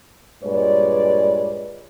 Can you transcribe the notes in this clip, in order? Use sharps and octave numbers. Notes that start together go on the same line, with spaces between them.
G2 A#2 G#3 B4 C#5 D5